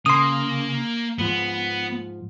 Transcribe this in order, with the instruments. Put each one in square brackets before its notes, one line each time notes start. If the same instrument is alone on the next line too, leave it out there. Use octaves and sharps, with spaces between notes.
[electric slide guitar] C#3 [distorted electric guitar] A#3 [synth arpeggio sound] C6 D#6
[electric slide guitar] G#2 F3 [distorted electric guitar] B3